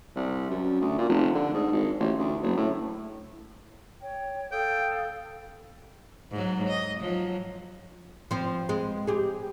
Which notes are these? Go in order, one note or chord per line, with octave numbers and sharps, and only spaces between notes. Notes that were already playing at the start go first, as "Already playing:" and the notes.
C2
F#2
D2
A#2
F1
D3
G#2
G#1
A1
D2
F#1
A2
C#5 G5
A4 F5 G5 D#6
G#2 F#3
D#5
F3 F#3
F3 C4
G#3 C4
G4 G#4